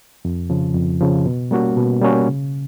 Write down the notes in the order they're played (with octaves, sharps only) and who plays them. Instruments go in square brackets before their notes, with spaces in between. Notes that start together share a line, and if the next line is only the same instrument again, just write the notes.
[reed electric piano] F2
C#3 F3
F2
C#3 F3
B2
G3 A#3 C#4 F#4
B2
G3 A#3 C#4 F#4
C#3